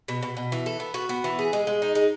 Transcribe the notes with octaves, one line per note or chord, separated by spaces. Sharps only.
B2
B2
B2
E3
A4
B3
F#4
B3
E3
G#4
G#3
G#3
D#4
G#3